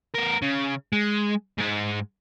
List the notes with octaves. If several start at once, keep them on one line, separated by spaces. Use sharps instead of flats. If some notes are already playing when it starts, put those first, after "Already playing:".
B3 A#4
C#3
G#3
G#2 G#3